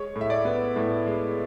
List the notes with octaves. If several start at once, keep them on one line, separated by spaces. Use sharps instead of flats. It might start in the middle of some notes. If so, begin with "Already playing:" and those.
Already playing: G#3 C#5
A2
E5
D5
B3
A2 E4
G#3